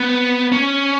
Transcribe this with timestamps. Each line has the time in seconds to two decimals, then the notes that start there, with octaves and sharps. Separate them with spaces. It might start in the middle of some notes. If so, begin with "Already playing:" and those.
Already playing: B3
0.52 C#4